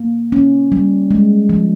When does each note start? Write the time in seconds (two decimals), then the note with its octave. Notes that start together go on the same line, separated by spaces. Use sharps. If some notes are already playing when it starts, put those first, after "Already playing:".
Already playing: A#3
0.32 C#4
0.72 G3
1.11 G#3
1.49 F3